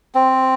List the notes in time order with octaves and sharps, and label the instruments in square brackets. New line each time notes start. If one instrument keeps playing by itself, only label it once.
[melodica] C4